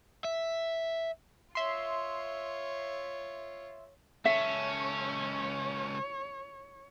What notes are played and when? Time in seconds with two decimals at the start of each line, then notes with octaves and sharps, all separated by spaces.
0.25 E5
1.55 F4 C#5 E5 C6
4.25 C#2 C#4 A4 C#5 E5